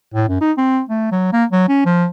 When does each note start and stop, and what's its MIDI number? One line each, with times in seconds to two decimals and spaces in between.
0.14 0.28 45
0.29 0.41 42
0.41 0.52 63
0.58 0.81 60
0.89 1.10 57
1.12 1.29 54
1.33 1.45 58
1.52 1.68 54
1.68 1.83 61
1.85 2.07 53